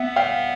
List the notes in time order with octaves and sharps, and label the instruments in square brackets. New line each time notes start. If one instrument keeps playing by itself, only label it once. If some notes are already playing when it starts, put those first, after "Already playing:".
Already playing: [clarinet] B3 [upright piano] E5 F#5
[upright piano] F5 G5